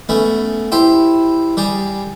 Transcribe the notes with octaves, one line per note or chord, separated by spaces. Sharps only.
A3 B3 C#4
E4 G4 C5
G3 G4 G#4